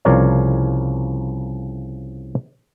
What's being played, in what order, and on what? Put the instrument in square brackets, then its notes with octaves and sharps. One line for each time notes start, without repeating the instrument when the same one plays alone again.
[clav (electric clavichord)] C2 C#3 F3 A#4 C#5 D5